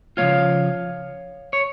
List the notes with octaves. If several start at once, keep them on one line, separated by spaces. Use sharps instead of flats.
C#3 F3 A3 F4 C#5 F5
C#5